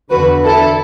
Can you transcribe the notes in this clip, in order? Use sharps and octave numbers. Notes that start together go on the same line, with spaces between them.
E2 D3 F#4 B4
E4 A4